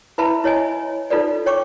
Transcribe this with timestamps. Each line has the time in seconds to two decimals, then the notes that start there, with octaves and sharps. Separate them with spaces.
0.18 E4 B4 E5 A5 B5
0.44 E4 C#5 D#5 G#5
1.10 D#4 F4 A4 B4 D5
1.46 C#5 G5 C#6 D6